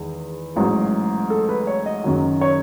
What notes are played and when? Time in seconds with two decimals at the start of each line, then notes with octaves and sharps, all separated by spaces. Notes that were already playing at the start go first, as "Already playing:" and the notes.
Already playing: E2 D#3 G#3
0.56 A1 G#2 F#3
1.30 A4
1.49 B4
1.67 C#5
1.86 D#5
2.04 F#1 F#2 D#3 F#3
2.41 C#5